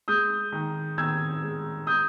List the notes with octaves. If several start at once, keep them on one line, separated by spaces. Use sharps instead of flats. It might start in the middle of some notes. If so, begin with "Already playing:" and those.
G#3 D#6 G6
D#3
D#3 E6 G#6
G#3
D#6 G6